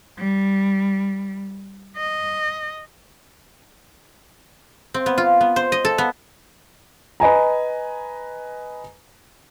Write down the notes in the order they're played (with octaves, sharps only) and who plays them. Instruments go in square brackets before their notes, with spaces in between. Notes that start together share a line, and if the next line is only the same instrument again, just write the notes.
[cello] G3
D#5
[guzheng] C4
B3
F4
B3
C5
D#5
A4
B3
[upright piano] B4 D#5 G#5 A#5